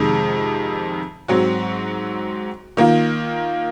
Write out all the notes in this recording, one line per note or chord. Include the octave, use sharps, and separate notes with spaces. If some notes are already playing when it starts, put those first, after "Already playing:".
Already playing: F2 C3 D#3 G#3
G#2 F#3 C4 F#4
D#3 A#3 F4